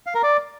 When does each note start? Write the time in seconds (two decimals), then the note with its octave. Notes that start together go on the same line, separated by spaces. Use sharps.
0.06 F5
0.15 A#4
0.23 D5